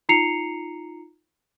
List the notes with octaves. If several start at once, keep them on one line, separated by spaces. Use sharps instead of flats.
D#4 F4 A#5 C7 C#7 F7